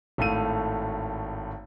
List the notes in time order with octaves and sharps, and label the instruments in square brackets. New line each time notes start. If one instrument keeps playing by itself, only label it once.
[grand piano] G#1 A2 A3 A4 F5 D#7